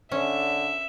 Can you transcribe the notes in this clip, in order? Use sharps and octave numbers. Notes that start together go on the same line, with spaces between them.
D3 C#4 E5